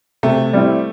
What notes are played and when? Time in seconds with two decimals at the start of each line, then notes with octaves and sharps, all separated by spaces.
0.23 C3 A3
0.53 G3 C4 E4